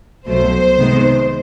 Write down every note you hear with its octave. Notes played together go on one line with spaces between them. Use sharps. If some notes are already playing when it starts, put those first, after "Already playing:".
C2 B2 F#3 A3 C5
C3 D#3 G#3 B3